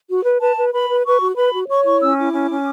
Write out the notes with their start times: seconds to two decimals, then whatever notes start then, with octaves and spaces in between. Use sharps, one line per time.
0.09 F#4
0.25 B4
0.41 B4 A5
0.56 B4
0.73 B4 B5
0.89 B4
1.05 B4 C#6
1.21 F#4
1.37 B4 B5
1.53 F#4
1.69 C#5 C#6
1.85 E4 C#6
2.01 C#4 E6
2.17 E4 D6
2.32 C#4
2.49 C#4